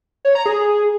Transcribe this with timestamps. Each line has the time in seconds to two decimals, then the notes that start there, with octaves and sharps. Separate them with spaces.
0.25 C#5
0.35 A#5
0.46 G#4